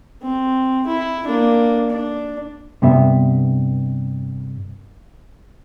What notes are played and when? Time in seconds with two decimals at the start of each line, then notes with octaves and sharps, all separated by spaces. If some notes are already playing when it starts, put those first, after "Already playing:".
0.22 C4
0.87 E4
1.27 A#3 D4
1.90 D4
2.82 G2 C3 B3 E5